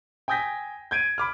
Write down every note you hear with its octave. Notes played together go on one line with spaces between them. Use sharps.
G5 G#5 D#6 G6 A#6 B6
G6 G#6 D7 D#7
B5 D6 F6